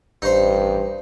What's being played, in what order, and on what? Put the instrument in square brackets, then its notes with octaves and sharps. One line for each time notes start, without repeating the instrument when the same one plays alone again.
[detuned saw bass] A1 [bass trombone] G2 [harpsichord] D#4 C5